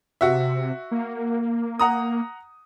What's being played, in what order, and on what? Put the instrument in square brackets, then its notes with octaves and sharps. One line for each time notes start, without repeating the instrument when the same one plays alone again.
[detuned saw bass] C3 [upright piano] F#4 E5
[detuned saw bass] A#3
[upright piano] F#5 A#5 D#6